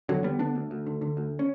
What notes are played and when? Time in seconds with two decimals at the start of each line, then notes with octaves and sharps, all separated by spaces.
0.09 E2 D3 F#3
0.24 D3 G3 B3
0.39 D3 B3 D4
0.55 D2
0.71 D2
0.86 D3
1.01 D3
1.17 D2
1.39 C#4